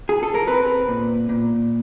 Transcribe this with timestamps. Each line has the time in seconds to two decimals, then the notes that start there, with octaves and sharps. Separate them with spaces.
0.09 G#4
0.23 A4
0.35 A#4
0.47 C4 B4
0.88 A#2
1.29 A#2